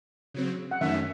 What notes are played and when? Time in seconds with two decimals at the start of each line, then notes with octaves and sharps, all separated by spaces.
0.34 C#3 F#3 C4
0.71 F#5
0.81 F#2 D#3 A3 C#4 E5